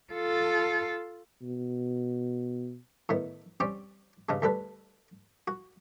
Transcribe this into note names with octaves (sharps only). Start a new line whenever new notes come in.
F4 A4
B2
A2 D#3 B3
G3 C4 C#4 G4 G5
G2 C#3 G#3
D2 G3 A4 B4
F#4